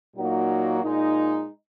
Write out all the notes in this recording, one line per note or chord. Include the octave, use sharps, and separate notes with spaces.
A#2 F#3 A#3 D#4 F#4
A#2 G#3 D#4